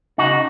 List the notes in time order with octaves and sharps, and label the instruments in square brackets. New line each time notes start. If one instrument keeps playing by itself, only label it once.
[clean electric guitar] C#3 D#4 F#4